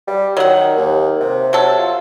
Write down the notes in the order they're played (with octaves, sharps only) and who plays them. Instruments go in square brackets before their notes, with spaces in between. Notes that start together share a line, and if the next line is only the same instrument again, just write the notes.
[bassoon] G3
[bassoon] D#3 [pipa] F#3 F#5
[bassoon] D#2
C3
[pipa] F#3 A4
[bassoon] F4